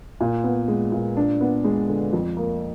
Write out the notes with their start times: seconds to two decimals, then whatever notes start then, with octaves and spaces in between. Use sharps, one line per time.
0.21 A#2
0.44 B3
0.68 G#3
0.92 A#2
1.17 D4
1.41 B3
1.64 G#3
1.89 D3
2.13 F2
2.37 A#3